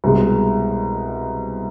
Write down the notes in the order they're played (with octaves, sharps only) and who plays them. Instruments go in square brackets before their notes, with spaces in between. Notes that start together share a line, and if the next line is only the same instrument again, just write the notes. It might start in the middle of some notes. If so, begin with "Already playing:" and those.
[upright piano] C2 B2 G#3